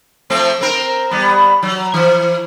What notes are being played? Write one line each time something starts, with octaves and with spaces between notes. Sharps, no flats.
F3 A3 C4
C4 A#4
G3 B3
F#3
E3